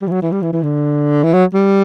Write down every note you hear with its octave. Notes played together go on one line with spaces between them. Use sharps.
G3
E3
F#3
E3
G3
E3
E3
D3
E3
F#3
G3